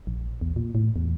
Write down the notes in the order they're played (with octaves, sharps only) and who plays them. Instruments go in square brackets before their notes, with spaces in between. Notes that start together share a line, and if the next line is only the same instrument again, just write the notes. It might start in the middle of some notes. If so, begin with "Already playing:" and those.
[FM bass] A#1
E2
A#2
A2
E2